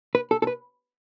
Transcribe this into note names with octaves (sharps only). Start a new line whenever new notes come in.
B4
A4
A4
B4